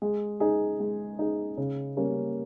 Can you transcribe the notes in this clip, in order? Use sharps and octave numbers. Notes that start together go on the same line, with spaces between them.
G#3
D#4 G#4
G#3
D#4 G#4
C#3
G3 A#3 C#4